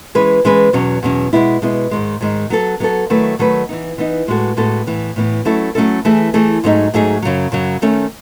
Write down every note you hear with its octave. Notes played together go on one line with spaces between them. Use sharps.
E3 G#3 C#4 G#4 B4
E3 G#3 C#4 G#4 B4
E2 B2 F#3 C#4
E2 B2 F#3 C#4
B2 G#3 B3 E4
B2 G#3 B3 E4
G#2 D#3 G#3
G#2 D#3 G#3
F#3 B3 F#4 A4
F#3 B3 F#4 A4
D#3 F#3 A3 E4 B4
D#3 F#3 A3 E4 B4
E3 B3 D#4
E3 B3 D#4
A2 G#3 B3 F#4 A4
A2 G#3 B3 F#4 A4
A2 E3 B3
A2 E3 B3
F#3 A3 C#4 E4 A4
F#3 A3 C#4 E4 A4
E3 A3 E4 G#4
E3 A3 E4 G#4
G#2 F#3 A3 D#4 G#4
G#2 F#3 A3 D#4 G#4
F#2 C#3 F#3
F#2 C#3 F#3
D#3 A3 C#4